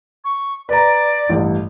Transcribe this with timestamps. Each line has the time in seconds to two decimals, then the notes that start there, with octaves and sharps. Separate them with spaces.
0.25 C#6
0.69 B4 D5 A#5
1.29 A1 G2